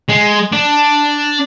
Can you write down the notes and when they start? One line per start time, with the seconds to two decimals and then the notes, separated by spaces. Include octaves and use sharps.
0.09 G#3
0.52 D4